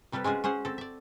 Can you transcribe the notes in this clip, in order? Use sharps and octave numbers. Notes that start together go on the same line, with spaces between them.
C3 G3 G4 A4 B4
G#3 C#4 F4 F#4 G#4
C#4 G#4 C5 F#5
C4 A4
D5 E5